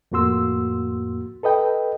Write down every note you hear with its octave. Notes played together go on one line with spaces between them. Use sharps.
F2 A2 A#3 F#4 C6 E6
A4 B4 D#5 G5